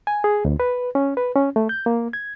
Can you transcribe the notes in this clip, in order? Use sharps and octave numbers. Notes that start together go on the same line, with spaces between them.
G#5
G#4
D2
B4
C#4
B4
C#4
A3
G6
A#3
G#6